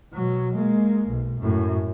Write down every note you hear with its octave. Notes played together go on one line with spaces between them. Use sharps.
B2 F#3
G#3 A#3
B1
F#2 A2